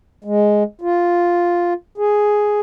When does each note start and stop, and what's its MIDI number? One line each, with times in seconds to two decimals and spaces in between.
0.24 0.63 56
0.81 1.74 65
1.98 2.61 68